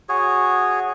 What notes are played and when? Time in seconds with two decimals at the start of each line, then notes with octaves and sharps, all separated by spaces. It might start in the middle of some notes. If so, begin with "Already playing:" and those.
0.09 F#4 G#4 C#5